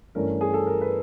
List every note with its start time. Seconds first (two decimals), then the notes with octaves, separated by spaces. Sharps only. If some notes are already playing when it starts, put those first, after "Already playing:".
0.15 G2 E3 A3 C#4 A#4
0.41 G#4
0.54 A4
0.67 A#4
0.81 B4